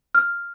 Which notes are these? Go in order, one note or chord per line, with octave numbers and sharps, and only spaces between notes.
F6